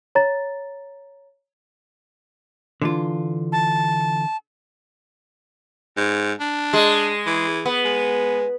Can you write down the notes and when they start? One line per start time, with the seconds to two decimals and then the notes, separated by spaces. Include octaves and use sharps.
0.15 C#5 A#5 A6
2.82 D3 E3 F4
3.52 A5
5.97 G#2
6.40 D4
6.73 G#3
7.26 E3
7.66 B3
7.85 G#3